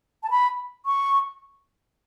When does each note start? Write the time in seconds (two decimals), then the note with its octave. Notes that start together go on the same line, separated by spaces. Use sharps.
0.23 A5
0.31 B5
0.86 C#6